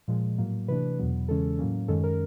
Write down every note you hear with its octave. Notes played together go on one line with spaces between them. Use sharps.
A#2 F3 G#3
A2 F#3 A#3
C3 E3 A3 D4 B4
E2 B2 F#3 B3
E2 C#3 E3 G#3 C#4 A4
A2 F#3 A#3 C#4
F#2 D#3 G#3 C#4 A4
A#4